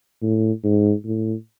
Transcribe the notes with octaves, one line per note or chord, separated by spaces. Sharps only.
A2
G#2
A2